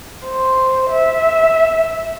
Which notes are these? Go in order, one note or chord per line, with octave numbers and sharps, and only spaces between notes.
C5
E5